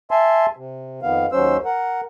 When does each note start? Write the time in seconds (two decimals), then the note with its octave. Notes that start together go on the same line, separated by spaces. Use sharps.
0.11 E5 G#5 A5 C6
0.57 C3
1.02 F2 D#3 B3 F5
1.32 D#2 F#3 C#4 C5 E6
1.65 A#4 F#5